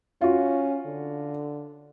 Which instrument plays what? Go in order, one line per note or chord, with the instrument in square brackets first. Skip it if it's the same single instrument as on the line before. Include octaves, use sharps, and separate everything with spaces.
[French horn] C#4 [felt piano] F4 F#4
[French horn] D3